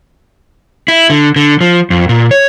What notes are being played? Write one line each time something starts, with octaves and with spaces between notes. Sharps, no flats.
E4
D3
D3
F3
F2
A#2
C#5